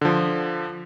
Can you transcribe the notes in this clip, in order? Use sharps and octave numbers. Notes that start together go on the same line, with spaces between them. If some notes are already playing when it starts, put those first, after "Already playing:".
D3 F3